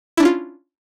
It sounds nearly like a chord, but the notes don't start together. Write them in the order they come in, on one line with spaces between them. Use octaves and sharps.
E4 D4 C#4 F4